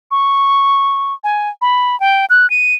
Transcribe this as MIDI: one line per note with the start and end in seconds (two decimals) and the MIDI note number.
0.11 1.14 85
1.24 1.49 80
1.62 1.98 83
2.00 2.26 79
2.30 2.49 90
2.50 2.74 99